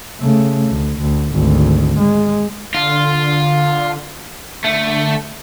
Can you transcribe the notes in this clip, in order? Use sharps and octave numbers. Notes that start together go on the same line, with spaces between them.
C#3 A3
D2
D2
G#1 D2
G#3
D3 F4
D3 A3